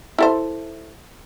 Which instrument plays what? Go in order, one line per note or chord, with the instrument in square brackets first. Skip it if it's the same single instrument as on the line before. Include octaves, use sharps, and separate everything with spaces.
[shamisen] E4 A4 C5